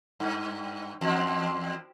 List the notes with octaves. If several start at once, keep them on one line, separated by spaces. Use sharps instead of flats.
G2
E2